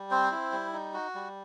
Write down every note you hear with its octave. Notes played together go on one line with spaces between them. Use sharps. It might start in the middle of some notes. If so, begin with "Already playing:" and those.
Already playing: G3
C4 C5
E4
G3
D#4
F#4
G3